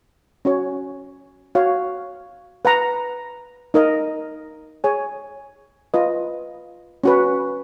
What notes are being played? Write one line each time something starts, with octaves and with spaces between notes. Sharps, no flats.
C#4 F#4 C#5
F#4 C#5 F5
B4 F#5 A#5
D#4 A#4 D#5
G#4 C#5 G#5
F4 B4 D#5
C#4 F#4 B4